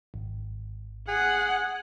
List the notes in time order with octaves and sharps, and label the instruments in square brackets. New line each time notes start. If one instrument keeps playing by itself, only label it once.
[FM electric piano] G#1
[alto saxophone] G#4 [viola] F#5